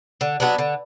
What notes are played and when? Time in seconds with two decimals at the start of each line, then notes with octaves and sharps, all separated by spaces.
0.21 D3
0.40 F#3 B3 D4
0.58 D3